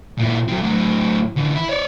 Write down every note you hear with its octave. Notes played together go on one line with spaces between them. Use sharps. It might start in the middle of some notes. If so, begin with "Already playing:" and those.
A#2 E4
F#3 C4
A2 F#3
D3 E3
E4
C#5 D5